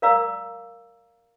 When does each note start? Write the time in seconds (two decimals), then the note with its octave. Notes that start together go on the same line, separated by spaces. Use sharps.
0.02 A#4 D5 F5 A#5 D6 E6